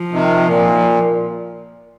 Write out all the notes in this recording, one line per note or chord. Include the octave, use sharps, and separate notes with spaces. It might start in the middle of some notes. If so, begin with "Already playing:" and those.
Already playing: F3
C3 D#3
A#2